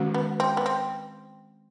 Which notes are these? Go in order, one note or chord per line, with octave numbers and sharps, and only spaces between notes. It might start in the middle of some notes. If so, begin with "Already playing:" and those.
Already playing: D#3 G#3 C#4 F#4
B3
C4
B3
C4